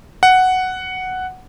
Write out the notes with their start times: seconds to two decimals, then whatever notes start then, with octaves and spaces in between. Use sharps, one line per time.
0.23 F#5